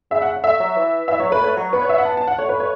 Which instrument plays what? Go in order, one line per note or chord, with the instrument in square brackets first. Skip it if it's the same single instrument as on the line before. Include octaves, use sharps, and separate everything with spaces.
[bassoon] C#3 [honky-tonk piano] E5
[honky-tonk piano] F#5
F#5
[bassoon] A3 [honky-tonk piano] E5
[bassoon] F#3
E3
[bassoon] E3 [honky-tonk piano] E5
[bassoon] F#3 [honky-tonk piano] C#5
[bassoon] A3 [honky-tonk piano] B4
[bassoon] A3 [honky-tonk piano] C#5
[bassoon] F#3
[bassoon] B3 [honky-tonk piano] B4
[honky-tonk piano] C#5
E5
F#5
A5
A5
F#5
[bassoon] A3 [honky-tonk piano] C#5
[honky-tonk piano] B4
C#5